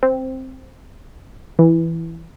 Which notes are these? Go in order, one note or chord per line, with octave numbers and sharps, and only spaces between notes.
C4
E3